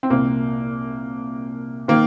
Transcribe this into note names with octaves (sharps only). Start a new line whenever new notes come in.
C4
C2 A#2 A#3
D#3 A#3